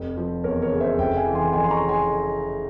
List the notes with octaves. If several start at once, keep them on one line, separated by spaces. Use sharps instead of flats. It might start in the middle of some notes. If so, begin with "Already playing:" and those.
Already playing: F1
F3
E2 A#4 C#5
A#4 C#5
C#3
C5 E5
F1 E5 G5
F5 G#5
E3
G#5 C6
F2 G#5 C6
C6
A#5 C#6
C#3
G#5 C6